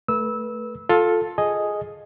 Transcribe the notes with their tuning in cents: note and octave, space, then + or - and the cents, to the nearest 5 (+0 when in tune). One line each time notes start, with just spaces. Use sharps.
A3 +0 B4 -25 E6 -15
F4 +20 A4 +0
G#4 +10 D#5 +0 G#5 +0